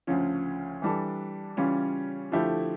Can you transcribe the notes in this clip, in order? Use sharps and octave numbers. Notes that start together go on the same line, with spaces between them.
D2 C#3 F3 C#4
E3 G3 D4 A4
C#3 E3 G3 C#4 F4
D3 F3 A3 E4 G4